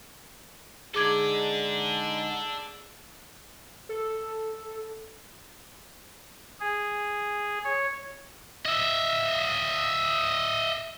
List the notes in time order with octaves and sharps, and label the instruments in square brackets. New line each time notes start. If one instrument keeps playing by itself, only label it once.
[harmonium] D3 G#3 D#4 [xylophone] G#4 D6 G#6 [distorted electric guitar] A4 D5
[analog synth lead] A4
[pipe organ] G#4
C#5
[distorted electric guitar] D#5 E5